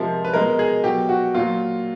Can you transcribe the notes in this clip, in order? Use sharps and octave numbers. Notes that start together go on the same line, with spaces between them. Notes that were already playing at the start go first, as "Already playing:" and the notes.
Already playing: C3 F3 G#3 A#4
B4
B2 G#3 A#4
G#4
B2 F#3 G4
F#4
A#2 F#3 F4